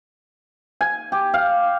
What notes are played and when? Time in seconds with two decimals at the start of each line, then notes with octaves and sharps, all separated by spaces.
0.81 G#5
1.12 G4
1.34 F5